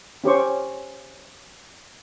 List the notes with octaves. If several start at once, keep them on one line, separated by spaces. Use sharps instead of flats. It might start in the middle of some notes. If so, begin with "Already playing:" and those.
C#4 G4 C5 C#6